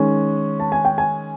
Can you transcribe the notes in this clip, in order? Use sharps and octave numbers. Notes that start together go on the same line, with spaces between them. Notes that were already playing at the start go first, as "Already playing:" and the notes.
Already playing: D#3 G#3 C#4
A5
G#5
G5
G#5